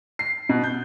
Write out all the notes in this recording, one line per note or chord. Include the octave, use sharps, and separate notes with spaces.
C7
B2
G6